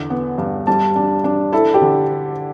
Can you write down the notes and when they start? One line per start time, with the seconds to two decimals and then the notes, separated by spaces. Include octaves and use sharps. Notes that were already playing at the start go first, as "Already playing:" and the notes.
Already playing: E2 D3
0.10 B3
0.38 G2
0.67 G3 A5
0.96 D4
1.24 D4
1.52 E4 A4
1.74 G4
1.82 D3